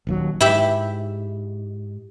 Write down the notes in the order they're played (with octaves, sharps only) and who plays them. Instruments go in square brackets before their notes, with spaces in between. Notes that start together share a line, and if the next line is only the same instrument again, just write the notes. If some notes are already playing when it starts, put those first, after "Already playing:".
[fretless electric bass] D#1 D#2 F#3
[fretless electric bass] G#2 [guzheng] E4 G4 E5